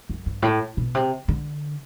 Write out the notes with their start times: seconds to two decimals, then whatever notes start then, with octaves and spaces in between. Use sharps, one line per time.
0.09 F#2
0.26 G2
0.42 A2
0.77 B2
0.95 C3
1.28 D3